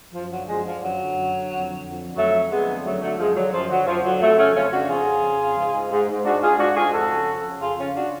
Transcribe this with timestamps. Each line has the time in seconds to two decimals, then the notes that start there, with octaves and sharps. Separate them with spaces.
0.12 F#2 F3
0.29 D3 F#3
0.46 F#2 F3 G#3
0.63 D3 F3
0.81 F#2 F#3
0.97 D3
1.14 F#2
1.32 D3
1.49 F2
1.66 D3
1.83 F2
2.01 D3
2.16 F2 F#3 A3
2.34 D3
2.50 F2 G#3 B3
2.68 D3
2.85 F#2 F#3 A3
3.01 D3 F#3 A3
3.18 F#2 F3 G#3
3.35 D3 F#3
3.52 F#2 F3
3.69 D3 F#3
3.87 F#2 F3
4.03 D3 F#3
4.20 F2 F#3 A3
4.37 C#3 A3 C#4
4.54 F2 C#4 F4
4.72 C#3 D4 F#4
4.89 F2 F4 G#4
5.06 C#3
5.23 F2
5.40 C#3
5.57 G#2
5.74 G#2
5.91 G#2
6.08 G#2
6.24 G#2 D4 F#4
6.41 G#2 F4 G#4
6.58 G#2 D4 F#4
6.75 G#2 F4 G#4
6.92 F2 F#4 A4
7.09 C#3
7.26 F2
7.44 C#3
7.60 F2 F4 G#4
7.78 C#3 C#4 F4
7.94 D4 F#4